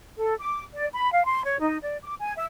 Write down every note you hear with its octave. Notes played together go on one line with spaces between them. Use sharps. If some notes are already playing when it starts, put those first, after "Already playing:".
A4
D6
D5
B5
F5
C6
C#5
D#4
D5
D6
G#5
E5